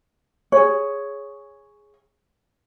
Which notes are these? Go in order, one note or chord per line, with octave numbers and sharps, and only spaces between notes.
G#4 C#5